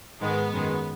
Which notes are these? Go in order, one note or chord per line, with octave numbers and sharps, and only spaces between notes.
G#2 D#3 G#3 B3
F#2 D#3 G#3